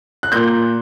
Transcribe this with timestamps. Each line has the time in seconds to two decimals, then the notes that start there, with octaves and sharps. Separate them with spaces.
0.23 F#6
0.32 A#2 G6